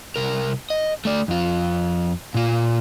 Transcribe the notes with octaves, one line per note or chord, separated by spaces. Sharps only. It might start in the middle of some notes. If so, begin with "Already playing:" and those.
C2 A#4
D#5
A3 D5
F2 F4
A#2 F4